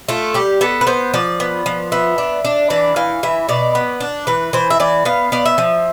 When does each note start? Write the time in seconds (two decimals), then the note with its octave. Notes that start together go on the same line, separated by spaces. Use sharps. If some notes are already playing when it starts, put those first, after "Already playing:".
0.08 A3 F4
0.34 G3 G4
0.61 B3 A4
0.81 B4
0.87 B3 C5
1.14 F3 D5
1.40 B3
1.66 F3
1.92 B3 E5
2.18 D4
2.45 D4
2.70 E3 D5
2.96 E3 F5
3.23 E3 E5
3.49 B2 D5
3.75 B3
4.00 D4
4.27 E3 B4
4.53 E3 C5
4.70 E5
4.80 E3 D5
5.05 B3 F5
5.32 B3 D5
5.46 E5
5.58 F3